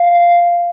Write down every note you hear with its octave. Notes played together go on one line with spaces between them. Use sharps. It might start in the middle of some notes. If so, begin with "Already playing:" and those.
Already playing: F5